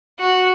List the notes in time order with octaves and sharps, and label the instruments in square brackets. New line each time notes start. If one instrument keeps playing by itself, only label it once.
[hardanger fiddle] F#4